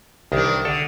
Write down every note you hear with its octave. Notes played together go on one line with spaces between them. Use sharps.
C2 D#3 E3 D4
D3 A4